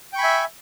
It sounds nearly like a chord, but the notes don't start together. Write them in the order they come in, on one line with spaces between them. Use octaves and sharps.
G5 C#6 B5 G#5 E5